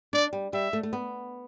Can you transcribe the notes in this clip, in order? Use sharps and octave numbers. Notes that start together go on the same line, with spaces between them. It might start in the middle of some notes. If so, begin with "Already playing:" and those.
D4 D5
G3
G3 E5
A3
A3
B3